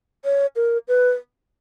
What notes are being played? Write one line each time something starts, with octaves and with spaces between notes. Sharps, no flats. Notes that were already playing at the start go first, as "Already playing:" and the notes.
C#5
A#4
B4